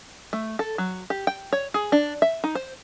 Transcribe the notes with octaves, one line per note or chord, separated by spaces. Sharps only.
A3
A4
F#3
G4
G5
C#5
G#4
D4
E5
D#4
C5